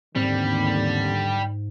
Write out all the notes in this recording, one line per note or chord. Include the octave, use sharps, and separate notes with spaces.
A1 D#2 G#2 D3 G3 C4